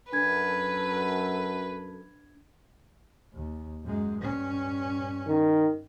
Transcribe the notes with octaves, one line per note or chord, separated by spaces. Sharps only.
F#2 D4 A4 B4 G#6
D#2
F#2 G#3
G2 C#4
D#3